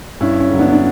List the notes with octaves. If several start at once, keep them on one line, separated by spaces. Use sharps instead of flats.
G2 C#4 E4
C#4
D3 F#3 E4
B3 D4
D4